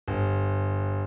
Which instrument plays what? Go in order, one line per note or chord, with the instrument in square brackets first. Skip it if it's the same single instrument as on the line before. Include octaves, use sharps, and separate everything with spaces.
[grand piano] G1